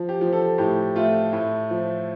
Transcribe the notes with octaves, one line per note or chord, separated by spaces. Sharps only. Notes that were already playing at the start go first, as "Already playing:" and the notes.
Already playing: F3
G4
F3
A4
A2 G4
A3 F4
A2 E4
F3